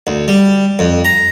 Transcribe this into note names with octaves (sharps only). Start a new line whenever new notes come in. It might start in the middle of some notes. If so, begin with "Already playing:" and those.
D2
G3
F2
A#5